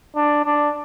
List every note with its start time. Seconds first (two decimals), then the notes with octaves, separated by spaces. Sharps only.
0.16 D4
0.46 D4